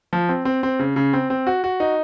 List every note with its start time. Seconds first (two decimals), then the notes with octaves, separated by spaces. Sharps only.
0.13 F3
0.29 C4
0.45 C4
0.63 C4
0.79 C#3
0.96 C#3
1.13 C4
1.30 C4
1.47 F#4
1.64 F#4
1.80 D#4